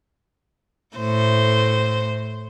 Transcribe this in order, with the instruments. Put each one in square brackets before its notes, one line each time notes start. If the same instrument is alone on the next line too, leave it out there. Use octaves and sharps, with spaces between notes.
[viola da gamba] A2 C5